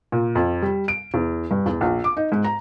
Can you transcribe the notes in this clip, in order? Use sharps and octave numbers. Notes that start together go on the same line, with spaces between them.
A#2
F2
G3
D7
E2
G2
E2
A#1
D6
D#4
G#2
A#5